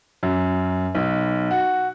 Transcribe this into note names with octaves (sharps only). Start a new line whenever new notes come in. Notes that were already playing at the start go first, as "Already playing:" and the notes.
F#2
B1
F#4